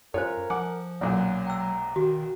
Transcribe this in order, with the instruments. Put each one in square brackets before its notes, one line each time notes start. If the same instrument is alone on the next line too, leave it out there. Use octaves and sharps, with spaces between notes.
[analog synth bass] F#2 [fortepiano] C#4 F4 C#5 [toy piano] A4 C5 [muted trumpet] A#4
[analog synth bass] F3 [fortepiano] F#5 D6 [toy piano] G#5
[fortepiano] B1 F#2 A#2 [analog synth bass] F#3 [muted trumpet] F#5
[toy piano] G5 E6 [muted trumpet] A#5
[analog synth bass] D#3 [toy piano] F#4